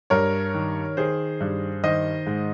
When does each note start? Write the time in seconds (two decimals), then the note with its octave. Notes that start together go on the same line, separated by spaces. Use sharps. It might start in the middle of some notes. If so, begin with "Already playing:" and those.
0.10 G2 A#4 C#5
0.55 D#3
0.97 D#3 G#4 C5
1.41 G2
1.84 D#3 C5 D#5
2.27 G#2